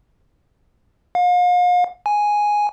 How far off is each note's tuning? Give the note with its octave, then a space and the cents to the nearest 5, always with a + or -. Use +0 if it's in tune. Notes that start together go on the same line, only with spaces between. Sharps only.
F5 +40
G#5 +0